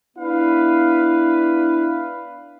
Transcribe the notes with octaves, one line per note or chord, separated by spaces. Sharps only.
B3 D4 E4 B4 F5